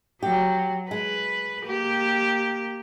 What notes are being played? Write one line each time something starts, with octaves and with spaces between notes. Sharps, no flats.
F#3 G4
G#3 B4
A#3 G4